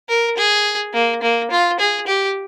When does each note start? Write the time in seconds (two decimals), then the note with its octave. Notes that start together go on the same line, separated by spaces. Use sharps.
0.09 A#4
0.37 G#4
0.94 A#3
1.22 A#3
1.51 F4
1.79 G#4
2.07 G4